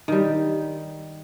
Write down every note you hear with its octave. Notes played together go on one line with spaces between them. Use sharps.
D#3 G3